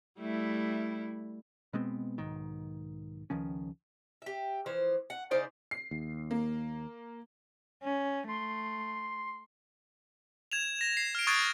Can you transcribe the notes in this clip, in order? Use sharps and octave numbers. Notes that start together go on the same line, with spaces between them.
G3 A3 E4
B2 G#3 B3 C4
B1 G#2 D#3
C#2 D#3 F3 C#4
G4 E5
E3 F3 C5
F#5
C#3 D#4 C5 D5
C7
D#2
A#3
C#4
A3 C6
G#6 E7 F7
A#6 E7
C7
F6 D7
C#6 D#6 F#6 G#6 A6 D7